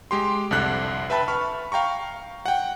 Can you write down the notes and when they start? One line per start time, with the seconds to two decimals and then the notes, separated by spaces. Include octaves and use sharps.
0.11 G#3 G4 C6
0.51 C2 F2 D3 F#6
1.10 B4 E5 G5 A5 B5
1.28 B5 C#6 F6
1.72 F5 G5 A#5 C#6
2.46 F#5 G5